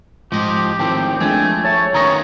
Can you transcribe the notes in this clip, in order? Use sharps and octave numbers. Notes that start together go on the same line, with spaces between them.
G#2 F3 G4 D#5
A2 D#3 C4 G5 A5
F3 G#3 A3 D4 G#5
C#5 E5 A5
D#3 B3 C#4 A#5 C#6 D#6 A#6